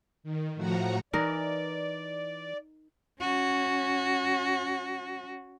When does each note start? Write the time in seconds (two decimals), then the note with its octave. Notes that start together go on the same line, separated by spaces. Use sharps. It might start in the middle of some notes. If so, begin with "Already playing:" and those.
0.23 D#3
0.55 A2 F3 F#4 F#5 A#5
1.13 E3 D#4 A#4 D5
3.20 C#4 F#4